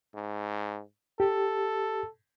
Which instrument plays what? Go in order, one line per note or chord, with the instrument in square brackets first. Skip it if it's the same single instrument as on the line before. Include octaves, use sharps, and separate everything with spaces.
[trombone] G#2
[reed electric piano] G4 [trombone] A4